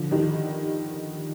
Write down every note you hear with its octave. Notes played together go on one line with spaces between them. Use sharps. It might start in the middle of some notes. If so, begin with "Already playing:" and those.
Already playing: D3 F3
D#3 G3